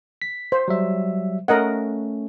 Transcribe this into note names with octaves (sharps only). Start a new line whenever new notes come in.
B6
C5
F#3 G3 E5
A3 C#4 A#4 D#5 F#5